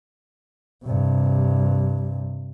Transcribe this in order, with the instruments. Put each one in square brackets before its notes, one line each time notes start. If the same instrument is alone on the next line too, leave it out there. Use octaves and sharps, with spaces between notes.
[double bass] G2 C3